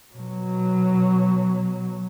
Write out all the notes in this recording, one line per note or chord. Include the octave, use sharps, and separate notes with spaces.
B2 F#3